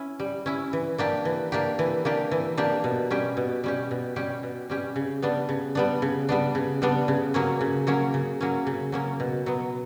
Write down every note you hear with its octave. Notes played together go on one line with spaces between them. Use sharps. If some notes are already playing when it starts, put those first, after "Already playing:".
Already playing: C#4 E4
G3
C#4 E4
E3
A#3 D4 G4
E3
A#3 D4 G4
E3
A#3 D4 G4
E3
A#3 D4 G4
B2
G3 C#4 G4
B2
G3 C#4 G4
B2
G3 C#4 G4
B2
G3 C#4 G4
C#3
G3 B3 D4
C#3
G3 B3 D4
C#3
G3 B3 D4
C#3
G3 B3 D4
C#3
F#3 A#3 C#4
C#3
F#3 A#3 C#4
C#3
F#3 A#3 C#4
C#3
F#3 A#3 C#4
B2
F#3 B3